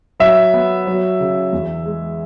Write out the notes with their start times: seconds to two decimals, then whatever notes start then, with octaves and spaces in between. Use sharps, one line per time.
0.20 F#3 E5
0.54 B3
0.87 F#3
1.20 C#3
1.53 E2
1.86 G#3